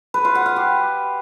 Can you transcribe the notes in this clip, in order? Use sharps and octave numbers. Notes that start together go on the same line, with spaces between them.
B4
F4
F#5
F5
G4